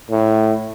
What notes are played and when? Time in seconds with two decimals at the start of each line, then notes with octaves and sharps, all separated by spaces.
0.11 A2